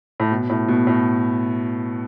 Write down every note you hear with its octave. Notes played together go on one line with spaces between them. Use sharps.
A2
B2
A2
B2
A2